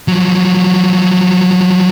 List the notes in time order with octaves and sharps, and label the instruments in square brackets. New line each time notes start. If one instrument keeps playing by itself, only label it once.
[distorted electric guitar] F3 F#3